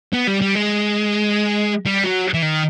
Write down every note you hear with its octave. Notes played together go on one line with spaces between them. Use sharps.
B3
G3
G3
G#3
G3
F#3
E3
D#3